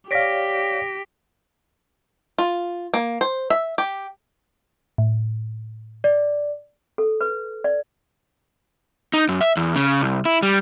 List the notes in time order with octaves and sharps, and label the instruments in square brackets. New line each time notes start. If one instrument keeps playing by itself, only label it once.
[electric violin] G4 [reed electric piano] C#5 D5 F5 [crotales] A#6 B6 D7
[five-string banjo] F4
A#3
C5
E5
G4
[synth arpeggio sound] A2
[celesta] D5
[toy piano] A4
B4
D5
[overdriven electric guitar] D#4
F#2
E5
E2
C#3
C2
E4
G3